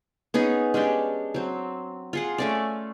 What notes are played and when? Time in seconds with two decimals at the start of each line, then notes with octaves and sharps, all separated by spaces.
0.34 B3 C#4 D#4 G#4
0.74 G#3 C#4 D4 G4
1.34 F#3 C4
2.13 F4 G#4 F#5
2.38 A3 C#4 D5